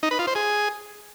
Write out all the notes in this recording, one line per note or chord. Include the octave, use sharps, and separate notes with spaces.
D#4
B4
F4
C5
G#4